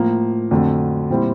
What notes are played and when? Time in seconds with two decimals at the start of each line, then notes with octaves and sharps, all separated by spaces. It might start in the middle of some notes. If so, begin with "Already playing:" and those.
Already playing: A2 F3 A#3
0.51 F2 D3 F#3 A3
1.10 A#2 G3 C4 E4